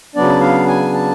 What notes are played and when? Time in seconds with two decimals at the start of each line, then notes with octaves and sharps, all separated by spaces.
0.15 C#3 F#3 B3 D4 D5
0.41 F5
0.68 G#5
0.94 A5